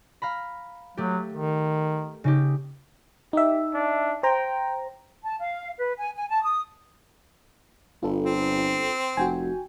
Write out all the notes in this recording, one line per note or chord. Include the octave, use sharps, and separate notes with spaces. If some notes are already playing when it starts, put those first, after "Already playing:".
F5 A#5 B5
F#3 A3 G4
D#3
C#3 D#4 G4
D#4 G4 E5
D4
C5 G5 A#5
A5
F5
B4
G#5
G#5
A5
D#6
G1 F4 A4
C4
F1 F#4 G5 G#5